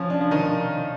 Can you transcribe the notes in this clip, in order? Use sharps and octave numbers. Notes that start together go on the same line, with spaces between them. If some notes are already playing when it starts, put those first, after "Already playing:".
Already playing: F3 C#4
D4
F3
D#3 D#4